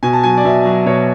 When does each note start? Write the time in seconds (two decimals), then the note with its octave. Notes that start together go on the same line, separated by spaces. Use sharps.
0.03 B2 G#5
0.13 A5
0.23 F#3 G#5
0.37 D5
0.45 B2 E5
0.65 F#3
0.86 B2 C#5